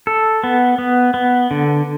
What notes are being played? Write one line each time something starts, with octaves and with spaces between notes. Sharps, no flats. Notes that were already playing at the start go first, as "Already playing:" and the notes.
A4
B3
B3
B3
D3